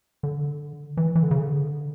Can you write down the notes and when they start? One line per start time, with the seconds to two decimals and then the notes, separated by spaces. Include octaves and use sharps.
0.23 D3
0.97 E3
1.15 E3
1.23 D3
1.31 C#3
1.38 D3